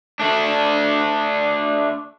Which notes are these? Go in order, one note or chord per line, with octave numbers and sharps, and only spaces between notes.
A3 D4